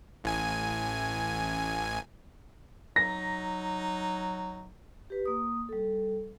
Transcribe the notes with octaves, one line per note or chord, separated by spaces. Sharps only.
A1 G#5
F#3 D#4 A#6
G4 B4
A#3 D#6
G3 A4